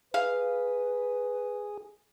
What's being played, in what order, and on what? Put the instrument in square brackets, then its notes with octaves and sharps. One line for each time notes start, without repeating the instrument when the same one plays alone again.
[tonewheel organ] G#4 [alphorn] B4 [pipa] F5